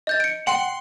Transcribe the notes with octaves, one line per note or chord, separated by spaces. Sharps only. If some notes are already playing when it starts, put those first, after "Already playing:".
D#5 G6 A6
C#7 D7
F#5 G5 C6